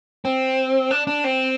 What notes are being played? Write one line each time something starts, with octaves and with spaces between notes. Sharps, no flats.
C4
D4
D4
C4